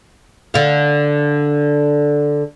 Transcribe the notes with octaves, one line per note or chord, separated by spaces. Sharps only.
D3 F5